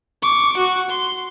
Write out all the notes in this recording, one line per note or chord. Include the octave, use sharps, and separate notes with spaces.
C#6 D6
F#4 C#6
C6